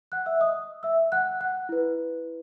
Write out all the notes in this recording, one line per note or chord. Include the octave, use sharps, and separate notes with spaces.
F#5 F#6
E5 E6
D#5 D#6
E5 E6
F#5 F#6
F#5 F#6
E4 B4